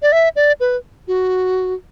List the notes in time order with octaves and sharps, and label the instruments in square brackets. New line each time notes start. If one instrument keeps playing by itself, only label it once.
[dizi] D5
E5
D5
B4
F#4